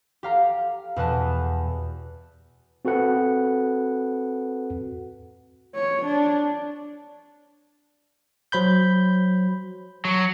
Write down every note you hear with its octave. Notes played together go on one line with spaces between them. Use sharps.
G4 F5 A#5
E2 B2 B4 A5
C4 F#4 A4 B4 F#5
C#5
D4
F#3 C5 B5 G6
F#3